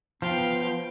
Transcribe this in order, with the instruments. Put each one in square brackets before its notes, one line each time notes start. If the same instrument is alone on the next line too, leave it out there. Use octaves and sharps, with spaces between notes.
[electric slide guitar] F3 [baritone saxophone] B3 [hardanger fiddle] F5 G5